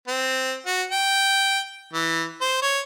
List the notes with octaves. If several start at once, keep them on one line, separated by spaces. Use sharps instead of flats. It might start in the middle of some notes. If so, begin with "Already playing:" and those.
C4
F#4
G5
E3
C5
C#5